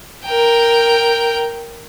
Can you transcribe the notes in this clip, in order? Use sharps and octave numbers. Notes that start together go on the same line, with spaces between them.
A#4 G5